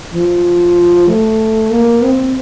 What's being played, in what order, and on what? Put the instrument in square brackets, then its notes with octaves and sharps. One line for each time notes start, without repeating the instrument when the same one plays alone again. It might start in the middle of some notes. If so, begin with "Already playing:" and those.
[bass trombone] F3
A3
A#3
C4